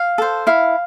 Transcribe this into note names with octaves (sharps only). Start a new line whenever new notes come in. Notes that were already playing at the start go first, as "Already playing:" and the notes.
Already playing: F5
A4 C5
E4 F5